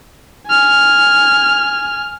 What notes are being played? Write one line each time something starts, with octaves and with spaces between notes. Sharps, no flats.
G#5 F6